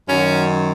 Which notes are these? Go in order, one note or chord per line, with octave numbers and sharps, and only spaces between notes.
F#2 D#3 F#3 C#4